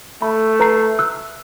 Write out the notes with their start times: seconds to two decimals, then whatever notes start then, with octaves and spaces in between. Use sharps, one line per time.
0.22 A3 B5
0.60 B4 A#5 C7
0.99 E6 F#6